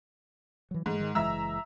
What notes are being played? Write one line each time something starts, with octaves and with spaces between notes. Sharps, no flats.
E3 F#3
G#2 E3 G#3 A3
D#3 G#3
F#1 E3 G#3 E5 A#5 E6